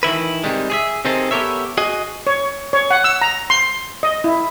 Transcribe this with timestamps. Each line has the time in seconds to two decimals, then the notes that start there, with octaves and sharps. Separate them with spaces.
0.03 D#3 E3 E4 B4
0.43 C3 D#3 G3 G#3
0.70 G#4 C#5 E5
1.05 C3 D#3 C4 D#4 G#4 A4
1.31 B3 G4 A4 A#4 C#5 E5
1.78 F#4 G#4 D#5
2.27 C#5
2.73 C#5
2.91 F#5
3.04 E6
3.22 A#5
3.50 C6
4.03 D#5
4.24 E4